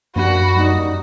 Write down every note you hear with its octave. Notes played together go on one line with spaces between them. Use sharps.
F#2 F3 A#3 D4 F#4 B5
G3 A#3 D#4 D5